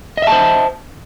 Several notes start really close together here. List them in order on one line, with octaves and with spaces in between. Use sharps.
D#5 E5 A5 C5